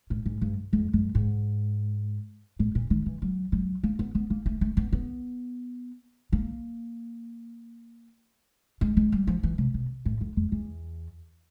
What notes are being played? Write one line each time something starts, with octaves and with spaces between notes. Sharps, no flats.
A2
G#2
G2
F2
F#2
G#2
A2
A#2
D#3
E3
F#3
F#3
A#3
B3
B3
A#3
A3
A3
B3
B3
A#3
G#3
G#3
G3
F3
E3
C3
B2
A2
F2
F2
E2